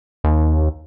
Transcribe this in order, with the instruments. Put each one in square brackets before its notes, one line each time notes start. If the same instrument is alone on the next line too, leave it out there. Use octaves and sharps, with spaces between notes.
[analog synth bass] D#2